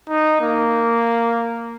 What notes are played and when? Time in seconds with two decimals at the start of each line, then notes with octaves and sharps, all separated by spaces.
0.09 D#4
0.41 A#3